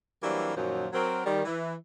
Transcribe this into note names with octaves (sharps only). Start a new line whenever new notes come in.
E3 F#3 G3 A#3 C4 D4
F#2 A#2 D#3 F3 F#3
F#3 C4 A#4
D#3 G3
E3